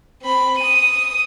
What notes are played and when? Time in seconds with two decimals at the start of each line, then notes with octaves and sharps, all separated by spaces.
0.22 C4 B5
0.59 D#6 D#7